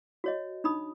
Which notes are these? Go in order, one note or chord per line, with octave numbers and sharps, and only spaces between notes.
F#4 C#5 D#5
D4 D#4 B5 D#6